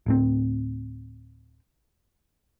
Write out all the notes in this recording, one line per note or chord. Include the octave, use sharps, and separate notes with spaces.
D1 A2 C4